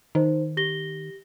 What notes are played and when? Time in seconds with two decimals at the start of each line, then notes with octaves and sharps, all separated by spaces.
0.15 D#3 D#4 C5
0.57 G4 A#6 G7